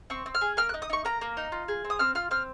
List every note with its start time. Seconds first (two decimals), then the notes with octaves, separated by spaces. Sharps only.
0.10 C4 C#6
0.26 C4
0.35 F6
0.41 G#4
0.57 A#3 F6
0.69 F#6
0.74 D#4
0.82 D#6
0.90 D#4 C#6
1.05 A#3 A#5
1.21 A#3
1.37 D#4
1.52 F4
1.68 G#4
1.85 C4
1.90 D#6
1.99 C4 F6
2.15 F4 F6
2.31 C4 F6